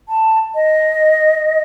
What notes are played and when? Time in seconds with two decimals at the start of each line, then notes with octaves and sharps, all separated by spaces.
0.09 A5
0.55 D#5